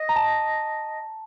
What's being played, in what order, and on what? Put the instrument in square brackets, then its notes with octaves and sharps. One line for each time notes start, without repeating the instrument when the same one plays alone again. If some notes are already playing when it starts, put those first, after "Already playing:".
Already playing: [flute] D#5
[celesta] A#5
A5